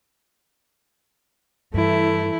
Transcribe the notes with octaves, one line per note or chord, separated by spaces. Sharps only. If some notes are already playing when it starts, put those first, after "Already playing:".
G2 E3 A3 E4